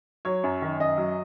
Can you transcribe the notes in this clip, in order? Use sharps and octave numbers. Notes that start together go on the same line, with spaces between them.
F#3 C#5
F#2
D#3
F#2 D#5
F#3